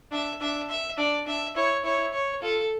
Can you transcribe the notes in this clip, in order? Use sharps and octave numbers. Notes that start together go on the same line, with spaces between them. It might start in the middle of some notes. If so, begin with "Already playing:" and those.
D4 E5
D4 E5
E5
D4 D5
D4 E5
E4 C#5
E4 C#5
C#5
F4 A4